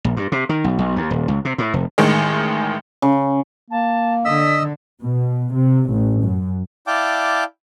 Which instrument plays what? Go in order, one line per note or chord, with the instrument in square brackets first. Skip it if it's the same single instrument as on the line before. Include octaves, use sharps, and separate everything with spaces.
[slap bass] A#1
G2
C3
D#3
B1
B1
D#2
D#1
C#2
C3
A2
F1
[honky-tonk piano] A1 D#3 G#3
[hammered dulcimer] C#3
[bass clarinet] A#3 [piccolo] A5
[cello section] D3 [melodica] D#5 E6 [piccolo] B6
[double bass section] B2
C3
A1
F#2
[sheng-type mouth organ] E4 D5 F5 G5 A5 D6